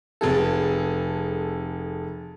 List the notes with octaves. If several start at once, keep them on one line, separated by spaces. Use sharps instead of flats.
F1 G#4 A4